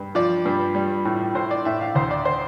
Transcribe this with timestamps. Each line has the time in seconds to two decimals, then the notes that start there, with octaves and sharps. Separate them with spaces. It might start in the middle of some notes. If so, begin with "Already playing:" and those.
Already playing: G2
0.15 F3 D5
0.45 G2
0.75 G3
1.05 A2
1.35 A2 C5
1.51 D5
1.65 A2 E5
1.81 F5
1.95 D2 C5
2.11 D5
2.25 C5